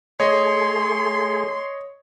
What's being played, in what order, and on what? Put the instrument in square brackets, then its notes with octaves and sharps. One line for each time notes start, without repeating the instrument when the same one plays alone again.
[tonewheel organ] A3 G#4 [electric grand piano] C#5 D#5 [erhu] C6